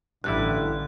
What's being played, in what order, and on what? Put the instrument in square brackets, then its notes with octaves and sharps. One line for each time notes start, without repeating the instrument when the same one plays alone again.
[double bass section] A1 [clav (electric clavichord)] G2 G3 E4 [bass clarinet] D3 [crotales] F#6